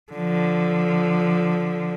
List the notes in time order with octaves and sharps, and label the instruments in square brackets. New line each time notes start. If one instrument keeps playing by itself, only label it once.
[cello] D3 F3